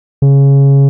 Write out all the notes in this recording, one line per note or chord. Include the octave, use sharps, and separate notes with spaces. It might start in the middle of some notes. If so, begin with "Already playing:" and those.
C#3